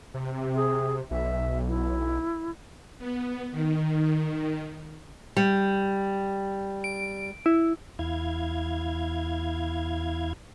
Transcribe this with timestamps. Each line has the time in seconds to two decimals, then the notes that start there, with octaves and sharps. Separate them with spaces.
0.14 C3
0.55 G#4
1.11 B1 E5
1.68 E4
2.99 B3
3.52 D#3
5.37 G3
6.84 D7
7.46 E4
7.99 E2 E4 F5 G#6